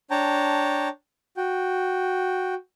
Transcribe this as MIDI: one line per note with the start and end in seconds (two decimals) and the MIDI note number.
0.11 0.88 62
0.11 0.88 73
0.11 0.88 79
0.11 0.88 81
0.11 0.88 82
1.37 2.54 66
1.37 2.54 79